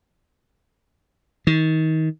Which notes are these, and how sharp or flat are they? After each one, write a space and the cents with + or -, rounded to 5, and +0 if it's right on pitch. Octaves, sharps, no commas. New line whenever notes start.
D#3 +30